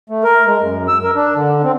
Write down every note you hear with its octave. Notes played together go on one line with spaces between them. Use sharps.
A3
A#4
G#3
F#2
E6
A#4
D4
D3
C4